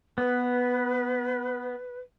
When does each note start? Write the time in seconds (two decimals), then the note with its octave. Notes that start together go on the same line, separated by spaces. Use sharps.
0.18 B3 B4